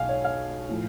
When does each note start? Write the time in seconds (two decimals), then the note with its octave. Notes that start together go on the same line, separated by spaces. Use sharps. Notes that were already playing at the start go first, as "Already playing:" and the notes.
Already playing: B1 B2 F5 G#5
0.09 C#5
0.25 F5
0.69 A2 F3